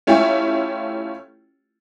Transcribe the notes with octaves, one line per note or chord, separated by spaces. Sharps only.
A3 C#4 E4 F4 G4